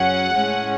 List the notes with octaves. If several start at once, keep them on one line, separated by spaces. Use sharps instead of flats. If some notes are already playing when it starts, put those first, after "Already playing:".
Already playing: F#2 C#3 F#3 C#4 F#5
A2 G#3 C#4